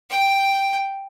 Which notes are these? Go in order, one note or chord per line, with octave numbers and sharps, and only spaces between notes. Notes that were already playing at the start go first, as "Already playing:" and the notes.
G5